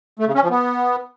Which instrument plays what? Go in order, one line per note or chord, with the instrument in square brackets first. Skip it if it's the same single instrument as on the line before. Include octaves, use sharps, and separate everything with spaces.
[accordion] A3
C#3
C#4
F3
B3